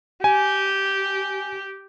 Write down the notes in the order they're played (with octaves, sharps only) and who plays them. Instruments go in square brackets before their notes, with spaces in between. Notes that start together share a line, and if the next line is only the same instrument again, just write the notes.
[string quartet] G4 [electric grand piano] G#5